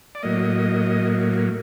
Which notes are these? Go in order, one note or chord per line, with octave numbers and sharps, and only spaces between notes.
D5
A2 F#3 A#3 D#5